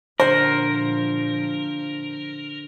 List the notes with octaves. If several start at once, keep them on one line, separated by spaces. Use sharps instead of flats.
A#2 D3 F3 A#4 C5 F#5